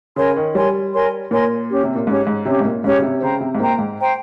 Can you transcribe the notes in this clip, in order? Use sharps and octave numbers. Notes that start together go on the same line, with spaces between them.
C#3 A#4 C#5 G#5 C6
D#3
G3 A#4 C#5 G#5 C6
A#4 C#5 G#5 C6
A#2 A#4 C#5 G#5 C6
C#4 G4 C#5
C3
A#2
G#2 C#4 G4 C#5
G#2
C3 C#4 G4 C#5
G#2
A#2
G#2 C#4 G4 C#5
C#3
C3
C#3 C5 G5 A#5
C3
G#2
A#2 C5 G5 A#5
G#2
C5 G5 A#5